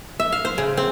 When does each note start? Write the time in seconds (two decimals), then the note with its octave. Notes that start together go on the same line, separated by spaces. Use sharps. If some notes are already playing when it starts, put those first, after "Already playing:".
0.20 E5
0.32 F5
0.45 C5
0.58 C#3
0.77 C4